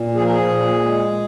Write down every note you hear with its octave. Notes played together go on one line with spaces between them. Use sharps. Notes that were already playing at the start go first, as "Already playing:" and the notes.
Already playing: A#2
F3 G#4
A#4
G#4
A#2
G#3